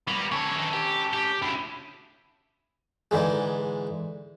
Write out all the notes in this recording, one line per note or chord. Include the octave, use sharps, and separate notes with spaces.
G3 A#3 B3
D3 C#4 A4 C#5
D#3 E3
G4
G4
D2 C#3 E4
G#2 D3 E3 G#3